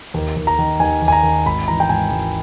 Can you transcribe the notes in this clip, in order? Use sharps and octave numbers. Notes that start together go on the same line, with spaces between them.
D#2
D#2
A#5
D#3
D#2 G#5
D#2
G#5
A#5
D#3
G#1 B5
E3 A#5
G5
G#1 G#5
G#1